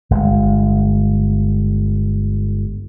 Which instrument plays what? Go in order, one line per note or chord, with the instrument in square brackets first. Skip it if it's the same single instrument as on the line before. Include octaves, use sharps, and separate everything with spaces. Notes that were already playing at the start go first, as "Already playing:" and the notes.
[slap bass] G1 G#3